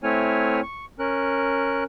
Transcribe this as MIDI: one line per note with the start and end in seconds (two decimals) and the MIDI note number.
0.03 0.60 57
0.03 0.60 60
0.03 0.60 64
0.03 0.60 73
0.03 0.60 80
0.03 0.60 89
0.63 0.85 85
0.99 1.84 61
0.99 1.84 70
0.99 1.84 90